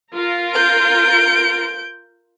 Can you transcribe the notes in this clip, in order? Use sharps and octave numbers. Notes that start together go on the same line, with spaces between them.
F4 A#4
G6 D7